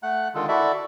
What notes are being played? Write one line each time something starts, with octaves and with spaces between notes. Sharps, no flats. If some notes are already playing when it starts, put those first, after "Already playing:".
A3 F#5 F#6
D3 D#3 G#3 F4 A4
E4 F#4 A4 D5 E5